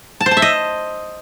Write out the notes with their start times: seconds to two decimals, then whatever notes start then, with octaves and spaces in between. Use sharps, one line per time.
0.20 A5
0.26 C5
0.31 A5
0.37 E5
0.42 D#5